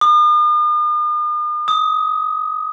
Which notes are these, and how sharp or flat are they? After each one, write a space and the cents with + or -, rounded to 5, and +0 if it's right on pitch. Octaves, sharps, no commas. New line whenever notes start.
D#6 -45
D#6 +20